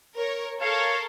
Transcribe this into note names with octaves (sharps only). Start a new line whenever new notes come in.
A#4 C#5
A4 A#4 C#5 F5